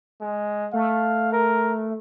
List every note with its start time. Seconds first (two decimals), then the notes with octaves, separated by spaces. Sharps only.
0.21 G#3
0.73 A3 F5
1.33 A#4